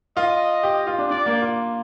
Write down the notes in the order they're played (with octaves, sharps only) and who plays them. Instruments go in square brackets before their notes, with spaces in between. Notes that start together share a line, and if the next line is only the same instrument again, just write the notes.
[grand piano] F4 [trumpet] D#5
[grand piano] G4
F4
D4
[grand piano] D4 [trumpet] D5
[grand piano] A#3
F4